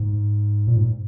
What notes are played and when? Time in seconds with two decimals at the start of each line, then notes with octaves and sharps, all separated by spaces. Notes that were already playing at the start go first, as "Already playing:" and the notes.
Already playing: G#2
0.67 A#2
0.76 G#2